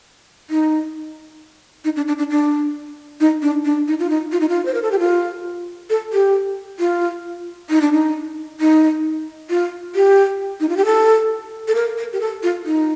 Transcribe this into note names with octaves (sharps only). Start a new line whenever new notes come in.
D#4
D#4
D4
D4
D4
D4
D#4
D4
D4
D#4
F4
D#4
F4
D#4
F4
C5
A#4
A4
G4
F4
A4
G4
F4
D#4
D4
D#4
D#4
F4
G4
D#4
F4
G4
A4
A4
A#4
A#4
G4
A4
F4
D#4